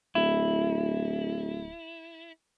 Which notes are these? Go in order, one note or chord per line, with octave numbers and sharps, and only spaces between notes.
D1 E4